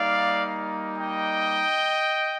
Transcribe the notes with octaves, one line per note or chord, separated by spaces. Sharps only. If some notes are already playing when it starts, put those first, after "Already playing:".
Already playing: G3 A#3 D#4 D5 F5
D#5 G5